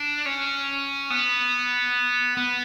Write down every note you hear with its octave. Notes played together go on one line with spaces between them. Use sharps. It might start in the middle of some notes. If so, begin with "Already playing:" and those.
Already playing: D4
C#4
B3
B3